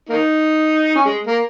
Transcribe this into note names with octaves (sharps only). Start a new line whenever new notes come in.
A#3 D#4
C#4
G#3
A#3